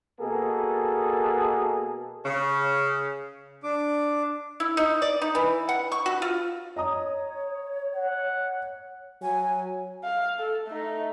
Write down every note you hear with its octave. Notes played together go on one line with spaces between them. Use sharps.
B2 A#3 G#4 A4
C#3
D4 D6
E4
D#4
D5
D#4
E3
F#5
C#6
F#4
F4
C#5 D#5 A#5 D#6
F#5
F#3 G#5
F5
A4
A3 D#4